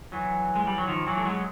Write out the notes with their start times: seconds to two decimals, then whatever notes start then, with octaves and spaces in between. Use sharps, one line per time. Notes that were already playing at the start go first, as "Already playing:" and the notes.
0.12 E3 F#3
0.56 G#3
0.67 G3
0.78 F#3
0.87 D#3 F3
1.06 E3 F#3
1.17 A3
1.25 F#3 G#3